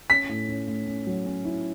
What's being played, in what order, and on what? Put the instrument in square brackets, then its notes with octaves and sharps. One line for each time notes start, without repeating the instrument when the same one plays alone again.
[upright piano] C#4 [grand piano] B6
[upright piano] A2
C#4
A2
C#4
F#3
C#4
E4